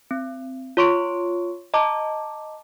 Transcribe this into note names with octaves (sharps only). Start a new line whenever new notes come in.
C4
F4 C#5 C6 C#6 D7
D#5 A5 A#5 D6